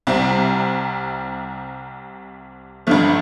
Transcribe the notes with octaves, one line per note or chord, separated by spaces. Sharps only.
C2 C3 G3 C4 E4
A1 G2 D3 F3 A3